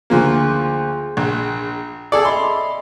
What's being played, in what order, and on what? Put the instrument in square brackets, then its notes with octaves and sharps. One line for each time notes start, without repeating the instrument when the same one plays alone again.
[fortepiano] D2 F3 A#3 [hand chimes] G#4 C6 G6
[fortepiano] A#1
G#4 A4 D5
[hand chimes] D#5 E5 B5 [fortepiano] C6